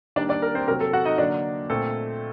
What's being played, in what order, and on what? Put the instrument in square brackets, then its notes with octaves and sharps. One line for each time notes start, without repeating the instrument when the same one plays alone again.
[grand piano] D#3 G3 A#3 D4 D5
D4 D5
A#4
C4 C5
C3 F#3 C4 A#4
A4
F#4 F#5
D#4 D#5
D3 F#3 A#3 D4 D5
A#2 A3 C4 A4